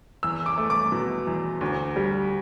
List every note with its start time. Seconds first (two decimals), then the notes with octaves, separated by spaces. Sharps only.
0.23 E2 E6
0.46 D6
0.58 A3
0.70 D6
0.92 B2
1.27 E2
1.61 D2
1.96 G3